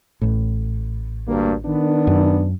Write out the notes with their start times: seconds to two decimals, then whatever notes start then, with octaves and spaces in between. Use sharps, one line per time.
0.22 A1 A2
1.27 D2 G2 A#3
1.65 D#3 B3 D4
2.07 F#2